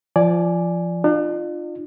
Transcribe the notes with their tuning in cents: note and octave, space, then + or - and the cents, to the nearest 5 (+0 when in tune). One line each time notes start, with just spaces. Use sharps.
F3 -20 D5 +0 G#5 +0
D4 +45 F4 +0